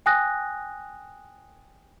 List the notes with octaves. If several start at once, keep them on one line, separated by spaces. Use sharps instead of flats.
G5 G#5 D#6 F#6 A#6